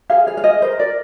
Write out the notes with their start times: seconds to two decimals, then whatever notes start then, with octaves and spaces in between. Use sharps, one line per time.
0.10 G#4 F5
0.27 G#4 F5
0.37 F5
0.44 G#4 D#5
0.62 A#4 C5
0.79 A#4 D5